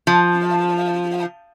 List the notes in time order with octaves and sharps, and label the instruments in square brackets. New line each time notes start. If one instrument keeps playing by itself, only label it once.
[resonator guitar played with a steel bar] F3